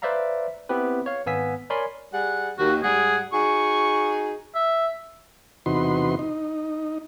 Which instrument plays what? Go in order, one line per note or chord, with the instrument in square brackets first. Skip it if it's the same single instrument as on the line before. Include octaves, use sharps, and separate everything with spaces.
[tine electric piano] B4 C5 D5 E5 F5 A#5
B3 C4 E4 G4 B4
C#5 F5
G#1 B3 F5 G#5 E6 B6
A#4 C#5 D5 G#5 B5 C6
[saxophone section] G3 G#4 F#5
[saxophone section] D#2 [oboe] F#4
[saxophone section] G#2 G3 F#5 [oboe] G#4
[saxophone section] D#4 F#4 G#4 [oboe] C#6
[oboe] E5
[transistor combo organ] E2 C3 D#4 F#4 B4 C6
D#4